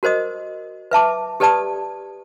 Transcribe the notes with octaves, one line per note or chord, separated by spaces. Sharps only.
F#4 A#4 C5 D#5 D#6
B4 E5 A5 D6
G4 A4 B4 D5 A5 D#6